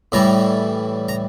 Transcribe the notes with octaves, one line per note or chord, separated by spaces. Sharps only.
A2 E3 G3 A#5
A#5